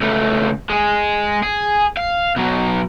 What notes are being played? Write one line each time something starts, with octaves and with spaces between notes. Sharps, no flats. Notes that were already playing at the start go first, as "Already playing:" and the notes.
C#2 A3
G#3 G#4
G#4
F5
B2 F#3